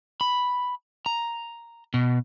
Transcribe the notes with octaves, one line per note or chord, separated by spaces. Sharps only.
B5
A#5
B2